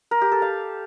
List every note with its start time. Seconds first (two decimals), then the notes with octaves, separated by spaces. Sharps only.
0.11 A#4
0.21 G4
0.32 A4
0.42 F5